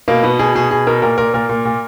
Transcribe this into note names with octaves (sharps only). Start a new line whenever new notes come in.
B2 A#3
B2 B3
B2 G#4
B2 G#4
B2 G#4
B2 A#4
A#2 A#4
A#2 A#4
A#2 A#4
A#2
A#2